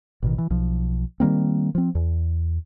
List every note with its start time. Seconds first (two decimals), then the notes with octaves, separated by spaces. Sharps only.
0.22 A1 B2 D#3
0.38 E3
0.50 B1 F3
1.20 D#3 G3 A#3 C4
1.75 F3 C4
1.95 E2